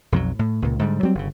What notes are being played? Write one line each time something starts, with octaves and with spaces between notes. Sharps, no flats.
B1 F2 E3 F#3
A2
C#2 A#2
G#2 D3 G3
F#3 G3 C4
G1 C#3